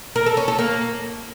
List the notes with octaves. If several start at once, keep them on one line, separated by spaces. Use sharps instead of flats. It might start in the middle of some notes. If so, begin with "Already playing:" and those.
A#4
A4
C#4
A4
A#3